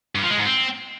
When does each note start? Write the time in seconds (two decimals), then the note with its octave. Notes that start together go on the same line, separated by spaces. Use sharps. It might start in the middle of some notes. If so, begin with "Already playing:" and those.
0.15 G2
0.23 F3
0.30 G#3
0.38 G#2
0.46 C4